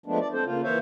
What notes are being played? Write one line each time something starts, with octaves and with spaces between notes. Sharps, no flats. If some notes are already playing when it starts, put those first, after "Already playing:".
F3 G#3 A3 B3 D4
D5
C4 A4 C5
C#3 A#3 F4
E3 A#3 C5 C#5 E5 F5